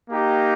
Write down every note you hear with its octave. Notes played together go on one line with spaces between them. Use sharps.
A#3 D#4 G4